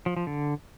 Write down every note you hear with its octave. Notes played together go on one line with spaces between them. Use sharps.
F3
F3
D3